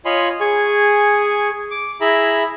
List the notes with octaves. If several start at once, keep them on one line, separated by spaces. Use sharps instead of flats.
F4 C#5 D#5 G#5 B5 C6
G#4 G#5 C#6
D6
E4 G#4 E5 A#5 B5